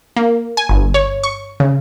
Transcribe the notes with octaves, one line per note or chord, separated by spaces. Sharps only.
A#3
G#5
G1
C#5
C#6
C#3